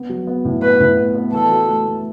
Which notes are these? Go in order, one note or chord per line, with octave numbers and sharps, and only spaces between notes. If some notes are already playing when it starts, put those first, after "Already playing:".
Already playing: B3
F#3
B3
A2
B3 B4
A2
B3
B3
E3 A4
F#4
A3
A3